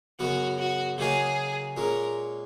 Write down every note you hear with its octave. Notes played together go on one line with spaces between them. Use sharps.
F#2 C#3 F#3 B3 F#4
F#4
C#3 F#3 A#3 D#4 F#4 G#4
A#2 G#3 C#4 A#4